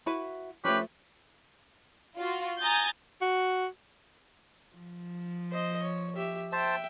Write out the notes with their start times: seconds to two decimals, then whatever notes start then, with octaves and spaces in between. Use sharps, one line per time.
0.06 E4 F#4 B4
0.65 F3 A3 C#4 G4 B4
2.17 F4 F#4
2.60 G#5 A#5 D#6 G6 A6
3.22 F#4
4.76 F3
5.51 C5 D#5
5.83 C#5
6.16 G4 E5
6.52 C5 E5 G5 A5